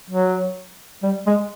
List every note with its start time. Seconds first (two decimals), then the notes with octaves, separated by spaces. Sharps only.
0.10 F#3
1.03 G3
1.27 G#3